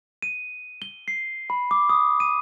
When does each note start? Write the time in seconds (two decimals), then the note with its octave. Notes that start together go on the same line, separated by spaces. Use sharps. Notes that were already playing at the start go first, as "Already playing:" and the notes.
0.22 D#7
0.82 G7
1.08 C7
1.50 B5
1.71 D6
1.89 D#6
2.20 D#7